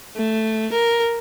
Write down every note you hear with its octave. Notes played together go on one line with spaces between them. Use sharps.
A3
A#4